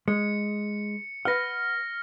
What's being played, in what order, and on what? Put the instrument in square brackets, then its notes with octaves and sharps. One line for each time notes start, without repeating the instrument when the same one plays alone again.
[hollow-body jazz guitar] G#3 [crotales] C#7
[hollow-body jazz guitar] B4 F#5 [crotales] F6 A#6